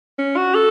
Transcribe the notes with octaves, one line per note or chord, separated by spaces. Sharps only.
C#4
F#4
A4